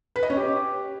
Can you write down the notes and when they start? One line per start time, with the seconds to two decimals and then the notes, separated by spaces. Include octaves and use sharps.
0.16 B4
0.23 D#5
0.30 C#4
0.37 G4